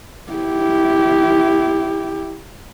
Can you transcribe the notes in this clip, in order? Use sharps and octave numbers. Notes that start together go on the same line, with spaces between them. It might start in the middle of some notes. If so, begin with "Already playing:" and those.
E4 G4